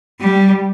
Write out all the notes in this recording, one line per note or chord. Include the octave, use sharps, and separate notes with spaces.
G3